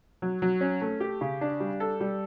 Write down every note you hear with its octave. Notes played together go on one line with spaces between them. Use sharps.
F#3
F#3
C#4
A3
G4
C#3
D4
G3
A4
G3